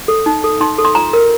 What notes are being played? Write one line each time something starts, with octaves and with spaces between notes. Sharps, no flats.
A4
D#4
A4
D#4 C6
A4
C6
F4 A#5
A#4